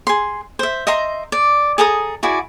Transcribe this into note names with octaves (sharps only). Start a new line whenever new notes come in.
G#4 C6
C5 E5
D#5 E5 A#5 C6
D5
G#4 A4 A#5 D#6
E4 F#4 G#4 D5